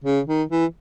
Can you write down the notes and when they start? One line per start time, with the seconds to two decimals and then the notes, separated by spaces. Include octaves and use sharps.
0.04 C#3
0.27 D#3
0.49 E3